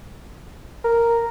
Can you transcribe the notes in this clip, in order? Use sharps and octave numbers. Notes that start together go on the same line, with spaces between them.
A#4